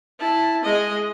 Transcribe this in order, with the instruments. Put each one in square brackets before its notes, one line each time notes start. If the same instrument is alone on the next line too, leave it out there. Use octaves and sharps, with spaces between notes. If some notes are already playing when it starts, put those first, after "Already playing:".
[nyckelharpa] E4 A5
G#3 D#5